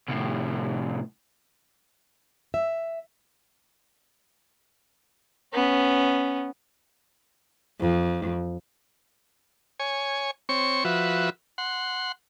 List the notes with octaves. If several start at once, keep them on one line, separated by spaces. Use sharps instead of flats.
C2 A2
E5
B3 C#4
F2
C#5 G#5
C4 C#5 C#6
F3 F#4 B4 E5
F#5 C6